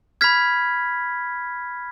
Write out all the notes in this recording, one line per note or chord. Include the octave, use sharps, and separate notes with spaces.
B5 F6 G#6 B6